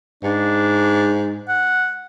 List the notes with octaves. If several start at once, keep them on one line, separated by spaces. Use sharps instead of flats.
G#2 D4
F#5